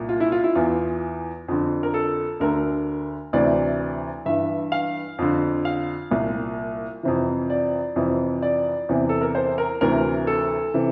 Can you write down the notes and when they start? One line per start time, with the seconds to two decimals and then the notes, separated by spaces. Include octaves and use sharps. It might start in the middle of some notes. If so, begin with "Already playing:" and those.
Already playing: C2 A#2
0.09 F4
0.20 E4
0.32 F4
0.44 E4
0.55 E2 E3 F4
1.48 F2 D3
1.83 A#4
1.94 A4
2.40 D2 D3 A#4
3.33 D2 C3 E3 D5
4.26 G2 E3 E5
4.72 F5
5.18 F2 D3
5.65 F5
6.11 C2 A#2
7.03 F2 C3 E3
7.50 D5
7.96 F2 C3 E3
8.42 D5
8.89 E2 C3 E3
9.09 A4
9.21 A#4
9.35 C5
9.58 A#4
9.81 D2 C3 E3 A#4
10.27 A4
10.74 C3 E3